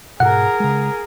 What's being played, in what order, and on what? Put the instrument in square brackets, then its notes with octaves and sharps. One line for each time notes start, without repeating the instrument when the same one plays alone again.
[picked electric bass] G#2 B2 [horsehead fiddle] G#4 A#4 [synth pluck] F#5
[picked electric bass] C#3 G#3